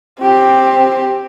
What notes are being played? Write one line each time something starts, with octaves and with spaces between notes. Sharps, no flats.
C4 G4